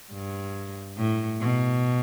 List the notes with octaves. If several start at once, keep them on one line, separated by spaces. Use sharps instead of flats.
G2
A2
B2